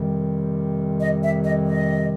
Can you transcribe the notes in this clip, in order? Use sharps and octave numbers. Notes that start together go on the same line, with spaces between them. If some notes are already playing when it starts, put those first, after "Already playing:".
Already playing: F2 C3 D#3 G3
D#5
E5
D#5
D#5